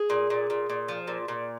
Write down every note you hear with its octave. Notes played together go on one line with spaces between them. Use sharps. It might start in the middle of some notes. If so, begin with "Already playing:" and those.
Already playing: G#4
A#2
A#2
A#2
A#2
F3
A#2
A#2